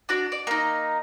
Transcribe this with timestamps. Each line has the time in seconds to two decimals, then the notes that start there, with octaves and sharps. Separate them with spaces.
0.09 D4 F#4 D5
0.32 D5
0.47 A#3 D#4